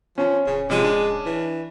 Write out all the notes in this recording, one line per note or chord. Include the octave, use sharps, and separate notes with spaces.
F3 C#4
D1 C#3
C3 F3 G#3 D#7
D4
E3